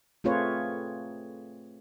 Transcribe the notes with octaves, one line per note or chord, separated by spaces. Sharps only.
A3 C4 F4 G#4 B4 C#5